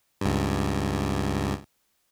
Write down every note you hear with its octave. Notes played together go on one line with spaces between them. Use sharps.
C#2 G2